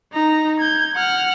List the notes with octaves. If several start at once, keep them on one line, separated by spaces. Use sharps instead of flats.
D#4 A#5
G6 G#6
F#5 F6